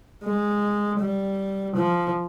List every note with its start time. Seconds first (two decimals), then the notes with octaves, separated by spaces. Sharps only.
0.24 G#3
1.00 G3
1.76 F3